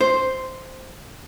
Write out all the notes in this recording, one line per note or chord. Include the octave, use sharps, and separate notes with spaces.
C5